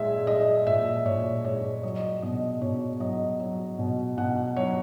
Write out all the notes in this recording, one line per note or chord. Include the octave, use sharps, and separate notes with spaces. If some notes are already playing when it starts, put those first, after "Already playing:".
Already playing: A#2 G#3 E5
G#3 D#5
A#2 E5
A#2 C#5
G#3 C#5
F#3 D#5
B2 D#5
B2 C#5
F#3 D#5
F#3
B2
B2 F#5
F#3 C#5